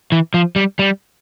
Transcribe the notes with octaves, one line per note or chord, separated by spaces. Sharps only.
E3
F3
G3
G3